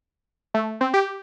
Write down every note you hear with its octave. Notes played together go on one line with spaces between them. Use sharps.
A3
C4
G4